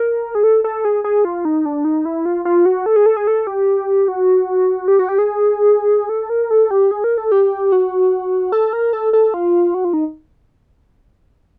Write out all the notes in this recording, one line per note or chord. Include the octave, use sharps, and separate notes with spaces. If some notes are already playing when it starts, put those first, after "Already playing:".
Already playing: A#4
G#4
A4
A4
G#4
G#4
F4
D#4
D4
D#4
E4
F4
F4
F#4
A4
G#4
A4
G#4
A4
G4
F#4
G4
F#4
G4
G#4
A4
A#4
A4
G4
G#4
A#4
A4
G4
F#4
A4
A#4
A4
A4
F4
F#4
F4
D#4